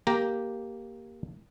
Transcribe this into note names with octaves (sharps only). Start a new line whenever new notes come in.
A#3 G4 A#5